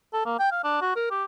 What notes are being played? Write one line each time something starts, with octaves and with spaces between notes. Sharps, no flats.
A4
A#3
G5
F5
D4
F#4
A#4
G4